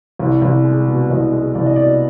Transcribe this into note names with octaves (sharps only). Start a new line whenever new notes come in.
C2
C2
G#3
B2
C2 D#5
G#3
C2 D5
D#5
B2 D5